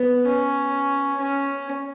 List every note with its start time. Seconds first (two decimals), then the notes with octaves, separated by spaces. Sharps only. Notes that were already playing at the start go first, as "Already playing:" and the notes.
Already playing: B3
0.27 C#4
1.20 C#4